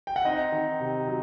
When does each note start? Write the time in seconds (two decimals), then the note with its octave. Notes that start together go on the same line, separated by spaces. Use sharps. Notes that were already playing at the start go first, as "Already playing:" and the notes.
0.07 G5
0.16 F#5
0.25 C4 D#4 D#5
0.52 D#3
0.80 C3
1.07 F#3